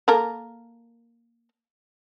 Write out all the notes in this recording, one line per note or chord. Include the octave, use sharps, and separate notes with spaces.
A#3 A4 A#4